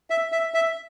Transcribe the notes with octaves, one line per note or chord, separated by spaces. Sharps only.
E5
E5
E5